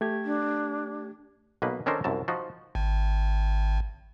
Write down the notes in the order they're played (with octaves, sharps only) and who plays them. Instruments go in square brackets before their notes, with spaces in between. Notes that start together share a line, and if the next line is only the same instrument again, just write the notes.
[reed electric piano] A3 G4 G#6
[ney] D4
[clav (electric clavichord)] B1 B2 A#3 B4
D#3 C#4 D4 A4 A#4 C5
C2 F#2 A5
F3 D#4 F4 F#4
[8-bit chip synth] G#1